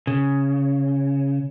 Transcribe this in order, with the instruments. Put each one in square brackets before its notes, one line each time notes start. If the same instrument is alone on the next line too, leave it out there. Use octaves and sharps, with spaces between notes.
[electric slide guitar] C#3